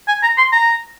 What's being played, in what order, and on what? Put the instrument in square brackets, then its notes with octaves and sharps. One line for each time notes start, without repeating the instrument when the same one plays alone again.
[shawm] G#5
A#5
C6
A#5